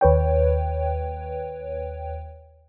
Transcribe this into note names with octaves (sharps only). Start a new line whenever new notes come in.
D#2 B4 C#5 G5